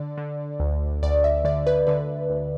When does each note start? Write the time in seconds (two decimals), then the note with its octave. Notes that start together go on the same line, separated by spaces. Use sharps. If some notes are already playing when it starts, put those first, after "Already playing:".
Already playing: D3 D5
0.18 D3
0.60 D2
1.03 D2 D5
1.24 E5
1.44 D3 D5
1.67 B4
1.87 D3 B4
2.30 D2